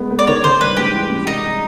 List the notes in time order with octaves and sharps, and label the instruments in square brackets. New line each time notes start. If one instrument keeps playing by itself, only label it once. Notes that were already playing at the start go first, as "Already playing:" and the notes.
Already playing: [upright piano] G#3 B3
B3
[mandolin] D5
[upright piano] D#3 [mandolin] C#5
[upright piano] D#3 [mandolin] C5
[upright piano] G2 [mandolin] B4
[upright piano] G#3 [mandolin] G4
[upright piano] E3
G#3
[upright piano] C2 [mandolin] D#4